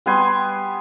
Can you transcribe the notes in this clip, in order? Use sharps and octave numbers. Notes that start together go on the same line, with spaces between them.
G3 B3 G#5 C6